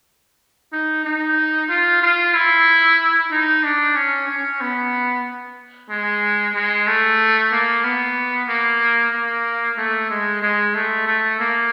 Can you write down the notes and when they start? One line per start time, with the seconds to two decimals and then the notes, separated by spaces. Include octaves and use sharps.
0.73 D#4
1.05 D#4
1.69 F4
2.02 F4
2.34 E4
3.31 D#4
3.64 D4
3.96 C#4
4.28 C#4
4.61 B3
5.90 G#3
6.55 G#3
6.87 A3
7.52 A#3
7.84 B3
8.48 A#3
9.13 A#3
9.78 A3
10.10 G#3
10.42 G#3
10.75 A3
11.07 A3
11.40 A#3